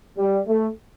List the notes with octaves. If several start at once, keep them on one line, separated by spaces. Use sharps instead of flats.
G3
A3